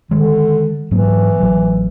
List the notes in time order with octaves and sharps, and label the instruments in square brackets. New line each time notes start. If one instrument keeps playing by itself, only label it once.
[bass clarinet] D3 [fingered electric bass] D#3 G#3
[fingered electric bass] G#2 F#3 A#3 [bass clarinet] E3
[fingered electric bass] A1 F#3